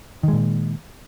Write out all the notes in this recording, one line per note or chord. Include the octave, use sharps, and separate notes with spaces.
A#2 D#3 G#3